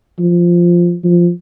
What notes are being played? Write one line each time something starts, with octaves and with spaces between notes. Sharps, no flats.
F3
F3